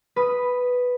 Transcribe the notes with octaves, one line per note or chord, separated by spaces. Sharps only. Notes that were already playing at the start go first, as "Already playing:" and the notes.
B4 D#6